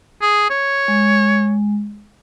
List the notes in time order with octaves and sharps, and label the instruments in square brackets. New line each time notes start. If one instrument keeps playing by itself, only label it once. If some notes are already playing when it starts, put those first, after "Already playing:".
[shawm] G#4
C#5
[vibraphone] G#3